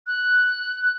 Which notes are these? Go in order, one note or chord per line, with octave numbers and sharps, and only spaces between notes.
F#6